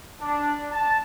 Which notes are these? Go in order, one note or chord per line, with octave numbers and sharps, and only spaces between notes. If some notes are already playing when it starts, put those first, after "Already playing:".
D4
A5